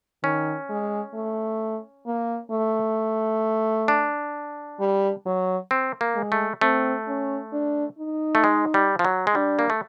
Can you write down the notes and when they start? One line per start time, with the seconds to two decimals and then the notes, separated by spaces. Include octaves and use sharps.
0.23 D#3 C#4
0.69 G#3
1.14 A3
2.07 A#3
2.51 A3
3.88 D4
4.80 G3
5.26 F#3
5.71 C4
6.01 A#3
6.16 G#3
6.32 A3
6.61 A3 C4
7.08 C#4
7.53 D4
7.99 D#4
8.35 A3
8.44 G#3
8.74 G3
8.99 F3
9.05 F#3
9.27 G#3
9.35 G3 D4
9.59 A#3
9.70 A3